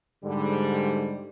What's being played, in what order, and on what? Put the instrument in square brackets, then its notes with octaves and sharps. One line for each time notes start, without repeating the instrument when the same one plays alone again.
[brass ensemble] G#2 D3 G3